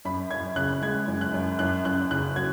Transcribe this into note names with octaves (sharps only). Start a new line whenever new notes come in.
F#2 B5
F#2 G#6
C#3 F#6
G#3 G#6
F#2
F#6
F#2
F#2 F#6
F#2 F#6
C#3 F#6
F#3 G#6